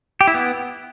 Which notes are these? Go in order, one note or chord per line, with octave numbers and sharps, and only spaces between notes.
G4
E4
B3